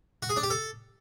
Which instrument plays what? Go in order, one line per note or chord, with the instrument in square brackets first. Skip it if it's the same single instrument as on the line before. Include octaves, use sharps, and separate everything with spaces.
[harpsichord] F#4
G#4
D4
G4
A4